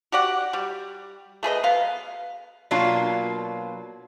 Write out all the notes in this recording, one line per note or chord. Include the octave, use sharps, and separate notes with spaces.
F#4 G4 D5 F#5
G3
A3 G#4 B4 D#5
F#3 B3 F5
B2 F#3 A#3 D4 F4 F5